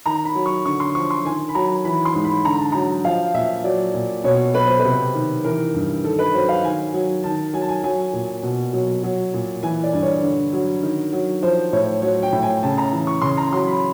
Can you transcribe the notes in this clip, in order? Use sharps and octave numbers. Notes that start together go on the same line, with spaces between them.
D#3 A#5
B5
F#3
C#6
D3 C#6
C6
F3 C#6
C6
D#3 G#5
B5
F#3 A#5
E3 B5
C6
G#2
B5
D3 A#5
A5
F#3 A#5
F3 F5
A#2 E5
F#3 D5
A#2
B2 C#5
F#3 B4
C5
B4
C3
D#3
E3 A#4
G2
D#3 A4
B4
F#3 C5
F5
D#3 G#5
F#3
D#3 A5
F#3 G#5
A5
G#5
F#3 G#5
A#2
B2
F#3
F#3
A#2
E3 G#5
D5
G2
C#5
D3
F#3
D#3
F#3
F3 C5
A2 C#5
F#3 C#5
G5
A2
G#5
C#3 A5
A#5
E3
C#6
C#3 C6
A#5
F#3 C6
B5